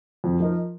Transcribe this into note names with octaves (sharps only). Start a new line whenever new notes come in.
F2
F3 D#4 A#4